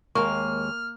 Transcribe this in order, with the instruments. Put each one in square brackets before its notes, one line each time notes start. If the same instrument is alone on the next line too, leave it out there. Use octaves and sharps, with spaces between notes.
[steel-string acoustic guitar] D#2 G#3 [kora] A#3 [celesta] C#6 [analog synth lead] F6